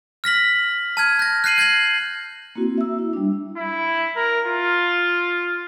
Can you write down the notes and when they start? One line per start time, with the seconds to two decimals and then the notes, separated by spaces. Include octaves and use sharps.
0.24 F6 A#6 B6 F#7
0.97 A5 F6 G#6
1.19 G6 A#6
1.44 F#6 G6 C7 D#7 F#7
1.58 G6 G#6 A#6 C7 F#7
2.55 A#3 C4 E4 F#4
2.78 E5 E6
2.99 E4
3.13 G3 D4
3.57 E4
4.16 A#4
4.47 F4